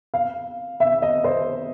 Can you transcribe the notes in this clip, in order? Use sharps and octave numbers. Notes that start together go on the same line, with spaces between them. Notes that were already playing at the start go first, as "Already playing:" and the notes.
F5
E5
D#5
C5